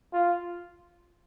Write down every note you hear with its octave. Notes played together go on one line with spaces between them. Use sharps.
F4